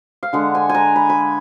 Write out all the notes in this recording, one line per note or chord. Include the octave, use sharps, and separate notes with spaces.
F5
D3 G#3 F#5
G#5
G#5
A#5
B5
B5